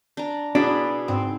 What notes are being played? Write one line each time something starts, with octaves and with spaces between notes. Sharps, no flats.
D4 A#5
B2 D4 E4 G#4 B5
G#2 C4